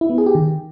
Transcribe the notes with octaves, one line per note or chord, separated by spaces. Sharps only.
E4
B3
G#4
G4
D#3